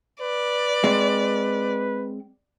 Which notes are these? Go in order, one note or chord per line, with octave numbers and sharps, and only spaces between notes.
B4 D5
G#3 C4